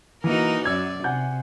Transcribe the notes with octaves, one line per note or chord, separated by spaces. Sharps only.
E3 A#3 D#4 F#4 A#4
F#2 D5 E6 G#6
C3 F#5 G#5 G6